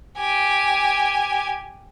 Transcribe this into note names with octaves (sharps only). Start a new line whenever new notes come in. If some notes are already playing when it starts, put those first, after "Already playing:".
G4 G#5